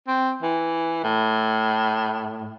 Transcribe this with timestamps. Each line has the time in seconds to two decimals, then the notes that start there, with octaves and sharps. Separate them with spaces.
0.08 C4
0.43 E3
1.04 A2